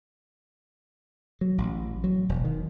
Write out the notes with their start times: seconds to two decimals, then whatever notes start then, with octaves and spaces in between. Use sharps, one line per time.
1.41 F#3
1.58 A1
2.04 F#3
2.29 E1
2.44 D#3